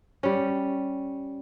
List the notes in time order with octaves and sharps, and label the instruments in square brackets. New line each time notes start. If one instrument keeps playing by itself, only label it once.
[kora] G3 C#4